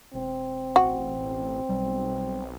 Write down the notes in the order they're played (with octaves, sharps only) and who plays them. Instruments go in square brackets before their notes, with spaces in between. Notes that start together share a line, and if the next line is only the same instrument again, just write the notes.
[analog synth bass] E1 [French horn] C4
[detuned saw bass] A1 [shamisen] F#4
[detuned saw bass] B1 [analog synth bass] G3